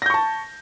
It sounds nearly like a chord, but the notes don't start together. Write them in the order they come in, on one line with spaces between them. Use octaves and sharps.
A#6 G6 C#6 A5